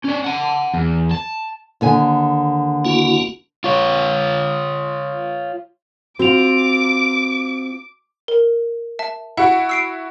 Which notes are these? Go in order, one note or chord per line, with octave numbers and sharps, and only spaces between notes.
C#4 D5
F#5 A5
E2
A5
D#2 D3 G#5
A#3 E4 F#4
F4 C#5
C4 F4 F#4 D6 F7
A#4
E5 A5
E4 F#4 F#5
E6 C7 D7